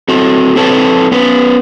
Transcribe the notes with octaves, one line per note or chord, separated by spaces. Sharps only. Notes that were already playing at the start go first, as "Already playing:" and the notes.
C4 F#4 A4
C4 D4 A4 B4 C#5 A5
B3 C#4 B4